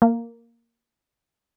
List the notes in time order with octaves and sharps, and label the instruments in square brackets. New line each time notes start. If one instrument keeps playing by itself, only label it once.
[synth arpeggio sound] A#3